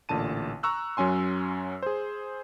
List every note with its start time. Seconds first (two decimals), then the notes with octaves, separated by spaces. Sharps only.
0.09 A1 A#2 D3 A5 D#7
0.63 A#5 C#6 E6 F#6
0.97 F#2 F#3 C#4 G#5 C6
1.83 G#4 C5